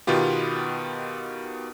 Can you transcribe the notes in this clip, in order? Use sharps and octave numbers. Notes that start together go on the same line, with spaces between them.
B2 D#3 B3 F4 G4